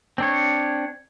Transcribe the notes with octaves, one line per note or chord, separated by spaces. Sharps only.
C4 D4 C#5